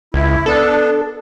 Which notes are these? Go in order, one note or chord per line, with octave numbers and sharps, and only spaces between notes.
C#2 E4
B3 D4 A4